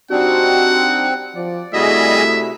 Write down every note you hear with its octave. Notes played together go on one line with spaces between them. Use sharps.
G3 C4 D4 D#4 F#4 F#5
F3 D5
C3 G3 A3 E4 F#4 G#4 D#5 E5